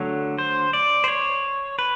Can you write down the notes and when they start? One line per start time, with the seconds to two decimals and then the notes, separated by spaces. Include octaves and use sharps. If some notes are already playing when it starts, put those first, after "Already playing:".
Already playing: D3 F#3 A3
0.38 C5
0.73 D5
1.04 C5
1.08 C#5
1.79 B4